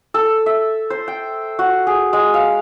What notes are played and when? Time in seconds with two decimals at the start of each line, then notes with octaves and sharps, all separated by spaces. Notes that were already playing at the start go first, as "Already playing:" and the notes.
0.14 A4
0.46 E5
0.90 C5
1.08 G5
1.59 F#4
1.87 G#4
2.13 G#3
2.34 F5